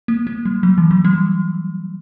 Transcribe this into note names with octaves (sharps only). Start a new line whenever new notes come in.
A#3
A#3
G3
F#3
E3
F#3
G3